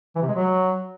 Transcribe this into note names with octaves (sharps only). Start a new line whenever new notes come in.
E3
C3
G#3
F#3